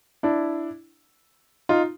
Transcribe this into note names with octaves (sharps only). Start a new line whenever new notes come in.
D4 E4
D#4 F4